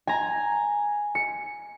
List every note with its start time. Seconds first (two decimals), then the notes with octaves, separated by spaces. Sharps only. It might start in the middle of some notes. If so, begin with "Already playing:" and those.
0.07 G#5 A#5
1.15 C#7